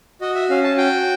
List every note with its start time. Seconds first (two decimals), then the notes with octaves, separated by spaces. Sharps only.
0.21 F#4 D#5
0.35 E5
0.50 C#4 F5
0.63 A5
0.77 F#4 G5